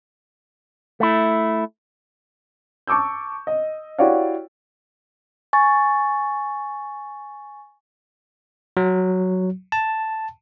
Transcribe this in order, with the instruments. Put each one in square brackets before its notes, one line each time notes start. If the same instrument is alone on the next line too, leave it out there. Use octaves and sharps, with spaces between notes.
[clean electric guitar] A3 E4
[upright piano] A5 C#6 D6 E6 G6
D#5
E4 F#4 G4 C#5 D5 F5
[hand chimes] G#5 C#6 A6
[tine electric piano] F#3
A5